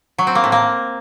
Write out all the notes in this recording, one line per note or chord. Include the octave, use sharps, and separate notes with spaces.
F#3
C4
A#3
A2
A#3